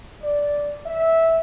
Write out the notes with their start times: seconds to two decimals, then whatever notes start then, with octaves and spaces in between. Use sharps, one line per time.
0.22 D5
0.86 E5